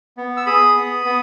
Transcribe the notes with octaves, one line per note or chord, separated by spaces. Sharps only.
B3
E6
G#4 B5 D#6
B3
B3